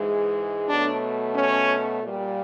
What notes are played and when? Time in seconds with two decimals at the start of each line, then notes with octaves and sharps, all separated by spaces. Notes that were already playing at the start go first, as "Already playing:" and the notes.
Already playing: G#2 E3 G#3
0.68 B2 F#3 A3 D4
1.35 C#4
2.02 A#2 G3